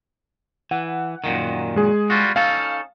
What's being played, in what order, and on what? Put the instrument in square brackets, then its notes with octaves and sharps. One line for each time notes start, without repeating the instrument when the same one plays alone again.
[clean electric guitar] E3 [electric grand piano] F#5
[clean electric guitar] F#2 A#2 D#3
[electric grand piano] G#3 G#4
[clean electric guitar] G3 F4 F#4
[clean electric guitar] C#4 D#4 A4 [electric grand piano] F5